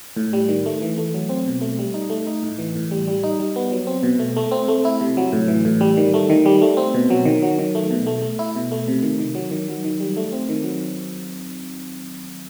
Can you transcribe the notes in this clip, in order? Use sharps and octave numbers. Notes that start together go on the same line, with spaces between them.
A2
G3
D#3
A3
E3
A3
F#3
C4
B2
A3
G3
D#4
A3
D#4
A2
E3
A2
G3
G3
D#4
G3
B3
F#3
C4
B2
A3
A3
C4
A3
E4
C3
F#3
A2
E3
A2
G3
D#3
A3
D#3
G3
A3
C4
B2
F#3
D#3
F#3
D#3
A3
B2
A3
A3
E4
B2
A3
C3
D#3
D#3
F#3
D#3
F#3
D#3
G3
A3
C4
D#3
F#3